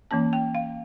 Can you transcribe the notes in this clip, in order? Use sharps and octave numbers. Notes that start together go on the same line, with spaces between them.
E3 A#3 C#4 A5
G5
F5